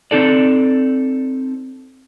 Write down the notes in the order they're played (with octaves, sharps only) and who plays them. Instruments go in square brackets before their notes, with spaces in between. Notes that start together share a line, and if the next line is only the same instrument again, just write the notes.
[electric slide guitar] C4 D#4 A4 D5